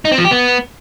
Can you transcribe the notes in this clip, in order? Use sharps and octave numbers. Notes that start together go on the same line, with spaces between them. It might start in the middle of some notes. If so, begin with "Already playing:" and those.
D#4
C4
F3
G4
B3